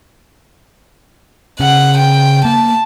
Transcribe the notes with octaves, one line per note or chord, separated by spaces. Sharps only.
C#3 F#5
G5
A#3 A5